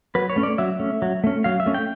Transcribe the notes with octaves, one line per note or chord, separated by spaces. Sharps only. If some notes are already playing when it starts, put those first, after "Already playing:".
F#3 B4
C#5
A3 C#4
D5
F#3 E5
A3 C#4
F#3
A3 C#4
F#3 F5
E5
A3 C#4
G5